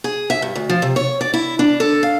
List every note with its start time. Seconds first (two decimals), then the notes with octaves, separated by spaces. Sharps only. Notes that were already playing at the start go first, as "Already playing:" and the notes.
0.04 G#4
0.30 E5
0.42 G2
0.55 D2
0.69 F3
0.82 C3
0.96 C#5
1.21 D5
1.34 E4
1.59 D4
1.80 A4
2.03 F5